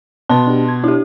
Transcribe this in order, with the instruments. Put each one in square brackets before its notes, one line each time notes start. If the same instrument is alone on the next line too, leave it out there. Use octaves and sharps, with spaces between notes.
[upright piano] B2 [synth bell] A5 C6
[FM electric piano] D4 G4
G#6
[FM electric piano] D4 [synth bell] E4 G4